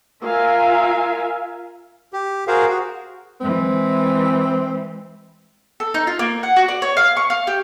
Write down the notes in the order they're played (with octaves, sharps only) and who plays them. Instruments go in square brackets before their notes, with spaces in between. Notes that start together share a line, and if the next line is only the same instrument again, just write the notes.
[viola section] F4 A#4 E5 F5 G#5
[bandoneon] G4
F#4 G#4 A#4 C5 F5
F#4
[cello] E3 G#3 [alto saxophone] C4
[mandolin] A4
D#4
F4
A#3
F#5
F#4
D5
C#5
F5
C#6
F5
G4